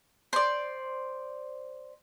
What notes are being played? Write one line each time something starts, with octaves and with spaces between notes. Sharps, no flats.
C5 D5